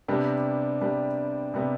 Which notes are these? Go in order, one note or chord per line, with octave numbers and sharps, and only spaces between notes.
C3 G3 B3 D4
C3 G3 B3 D4
C3 G3 B3 D4